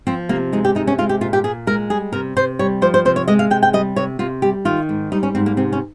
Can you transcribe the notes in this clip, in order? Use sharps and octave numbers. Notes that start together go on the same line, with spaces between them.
F3 C4
C3 A#3
G#3 D#4
G4
C3 D#4
C#4
G#3 F4
G4
A#2 F4
G4
A#2 G#4
G#3 A#4
G3 G#4
C3 A#4
C3 C5
G3 C#5
F3 C5
C5
C3 C5
C#5
G#3 D#5
F5
C3 G5
G5
G3 D#5
C3 C#5
C3 F4
G3 G4
D#3 F4
G#2
G3 D#4
C#4
G#2 C4
A#3
C3 C4
C#4